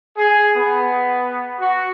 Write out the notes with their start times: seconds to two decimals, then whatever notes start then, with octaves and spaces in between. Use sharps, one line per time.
0.17 G#4
0.55 B3
1.60 F#4